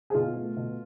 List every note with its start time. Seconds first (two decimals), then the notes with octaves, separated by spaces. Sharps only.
0.10 G#4
0.14 B2 F4
0.36 A3
0.57 B2